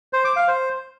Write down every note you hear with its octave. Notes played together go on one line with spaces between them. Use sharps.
C5
D6
F5
C5